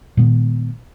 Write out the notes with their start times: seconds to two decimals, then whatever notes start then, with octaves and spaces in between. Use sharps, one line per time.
0.17 A#2 D#3 G#3 B3